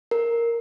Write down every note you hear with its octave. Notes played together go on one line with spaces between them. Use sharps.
A#4